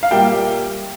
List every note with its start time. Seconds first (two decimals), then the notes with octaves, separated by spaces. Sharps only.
0.03 F5
0.11 A#2 G3 A#3 E5 G5